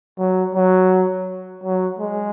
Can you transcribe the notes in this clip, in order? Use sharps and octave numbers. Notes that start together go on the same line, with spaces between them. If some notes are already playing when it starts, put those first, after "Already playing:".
F#3
F#3
F#3
G#3